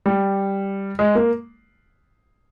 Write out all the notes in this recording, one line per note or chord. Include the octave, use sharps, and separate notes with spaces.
G3
G#3
A#3